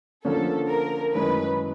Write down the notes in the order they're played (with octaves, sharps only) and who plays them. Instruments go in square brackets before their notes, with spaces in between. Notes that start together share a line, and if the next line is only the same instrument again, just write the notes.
[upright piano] D3 F3 A#3 C#4 [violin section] A4
[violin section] A#4
[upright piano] F#2 D#3 G#3 C#4 E4 [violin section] B4